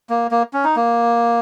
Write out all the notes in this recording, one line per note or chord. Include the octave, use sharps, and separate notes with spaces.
A#3
A#3
C#4
D#4
A#3